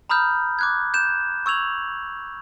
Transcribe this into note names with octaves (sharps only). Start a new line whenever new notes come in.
A#5 B5 D#6 F6 G6
D6 F#6 G#6
G6 E7
C#6 E6 G#6 F7 F#7